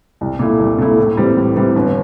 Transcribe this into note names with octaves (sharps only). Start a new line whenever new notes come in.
C2
A#2 A3 E4
C2
A#2 A3 E4
A2
E3 G3 C4
A2
E3 G3 C4
G1